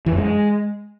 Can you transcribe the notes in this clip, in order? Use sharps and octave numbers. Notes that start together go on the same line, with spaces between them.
E3
F#2
G#3